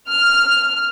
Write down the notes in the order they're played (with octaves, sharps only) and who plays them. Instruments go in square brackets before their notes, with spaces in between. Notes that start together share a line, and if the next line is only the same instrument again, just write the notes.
[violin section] F6